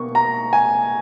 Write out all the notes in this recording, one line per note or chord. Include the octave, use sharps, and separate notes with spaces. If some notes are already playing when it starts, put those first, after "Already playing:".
Already playing: B2 A#3 C#6
A#5
G#5